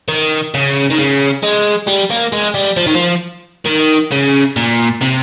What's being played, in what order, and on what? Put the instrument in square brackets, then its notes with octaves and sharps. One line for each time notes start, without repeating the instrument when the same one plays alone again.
[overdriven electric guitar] D#3
C#3
D#3
C#3
G#3
G3
A#3
G#3
G3
F3
D#3
F3
D#3
C#3
A#2
C3